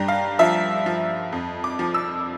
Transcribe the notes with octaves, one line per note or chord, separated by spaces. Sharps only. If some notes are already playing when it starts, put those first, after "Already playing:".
Already playing: G2 G5 A#5
F5
F3 E5
F3
F2
D6
F3
E6